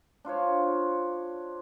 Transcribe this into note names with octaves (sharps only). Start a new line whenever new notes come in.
D4 F4 C5 C#5